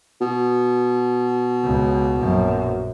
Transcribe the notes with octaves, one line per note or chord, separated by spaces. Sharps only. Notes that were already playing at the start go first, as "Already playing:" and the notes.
B2
C#2
A#1 F#2